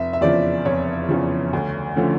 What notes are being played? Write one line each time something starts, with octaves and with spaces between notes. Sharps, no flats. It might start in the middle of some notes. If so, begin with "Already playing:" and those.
Already playing: F1 E5
E5
E2 C#3 F3 D5
F1 C#5
E2 C#3 F3
D2
D3 F3 A3 C#4